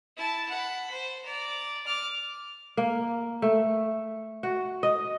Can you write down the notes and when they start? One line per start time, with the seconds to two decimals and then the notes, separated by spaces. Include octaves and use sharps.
0.17 E4 A5
0.50 F#5 B5
0.91 C5
1.24 D5 A#5
1.85 D6 F6
2.77 A#3
3.42 A3
4.43 F#4
4.83 D#5